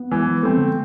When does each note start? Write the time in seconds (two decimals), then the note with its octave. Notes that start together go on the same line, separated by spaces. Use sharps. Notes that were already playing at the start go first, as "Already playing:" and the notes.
Already playing: B3
0.11 E3 G#3
0.27 F3
0.43 A3 C4
0.57 D3